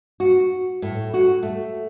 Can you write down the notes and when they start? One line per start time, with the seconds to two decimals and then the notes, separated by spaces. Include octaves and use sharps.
0.20 F#4
0.82 A2
1.14 F#4
1.43 A3